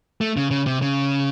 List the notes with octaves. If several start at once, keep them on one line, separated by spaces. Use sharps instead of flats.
A3
C#3
C#3
C3
C#3